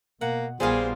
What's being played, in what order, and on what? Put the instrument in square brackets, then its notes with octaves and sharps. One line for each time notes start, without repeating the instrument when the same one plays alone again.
[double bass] B2 [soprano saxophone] A#3 [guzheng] F#5
[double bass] A#1 B3 [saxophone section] A#2 G#4 [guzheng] G3 A#3 F4 [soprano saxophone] C5